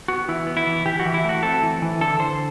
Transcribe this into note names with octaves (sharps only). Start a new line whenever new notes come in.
B3 F#4
E3 E4
B3
E4
E3
E3 G4
F#4
E3
E4
A3 F#4
C4 A4
E3
E3
D3 A4
D3 C5